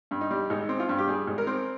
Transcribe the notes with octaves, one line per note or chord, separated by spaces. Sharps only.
G2
D#4
G3
G#1 D#4
C4
F4
G2
G4
G3 G#4
G#1
A#4
C4